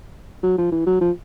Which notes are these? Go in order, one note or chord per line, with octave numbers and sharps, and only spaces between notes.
F#3
F3
E3
F#3
F3